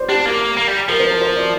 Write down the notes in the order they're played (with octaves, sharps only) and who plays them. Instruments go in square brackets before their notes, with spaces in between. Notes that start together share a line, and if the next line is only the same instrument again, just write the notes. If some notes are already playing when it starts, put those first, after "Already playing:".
Already playing: [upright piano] C5 D5
[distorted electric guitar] D4 [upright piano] G4
[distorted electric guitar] A#3
A#3
G3
[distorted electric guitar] F3 [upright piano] A#4
[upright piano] C5
A#4
C5
D5